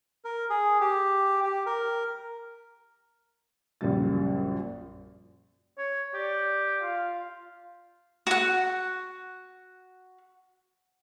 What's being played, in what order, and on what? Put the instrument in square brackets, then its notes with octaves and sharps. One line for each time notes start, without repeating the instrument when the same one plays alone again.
[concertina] A#4
G#4
G4
G4
A#4
[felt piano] A#1 F#2 A#2 C#3 G3 A6
[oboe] C#5
[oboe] G4 [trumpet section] D5
[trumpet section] F4 F5
[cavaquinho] F#4 F#5